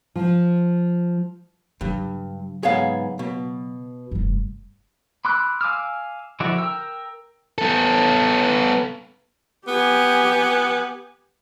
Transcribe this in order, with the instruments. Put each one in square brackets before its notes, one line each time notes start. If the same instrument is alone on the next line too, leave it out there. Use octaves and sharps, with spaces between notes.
[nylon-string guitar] F3
[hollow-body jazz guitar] G2 [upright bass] C#3 F#3
[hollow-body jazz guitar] G#2 B3 G#4 [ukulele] C#5 F5
[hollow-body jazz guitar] B2
[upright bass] F1 G2
[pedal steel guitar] B5 C6 D6 E6 F#6
F5 G#5 D6 E6 F6
D3 F3 E4 F#4 D5
A#4 G5 E6
[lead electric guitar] B3 A4
[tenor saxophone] B3 [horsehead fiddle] G4 G#5